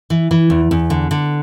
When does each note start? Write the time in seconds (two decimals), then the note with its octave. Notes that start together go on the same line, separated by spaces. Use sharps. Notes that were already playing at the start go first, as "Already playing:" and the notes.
0.10 E3
0.31 E3
0.50 E2
0.71 E2
0.90 D3
1.11 D3